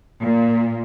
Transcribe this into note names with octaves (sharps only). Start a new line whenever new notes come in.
A#2